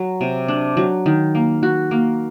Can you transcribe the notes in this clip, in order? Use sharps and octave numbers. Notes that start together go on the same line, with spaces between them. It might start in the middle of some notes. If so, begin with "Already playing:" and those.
Already playing: F#3
C3
D4
F#3
D#3
A#3
F#4
A#3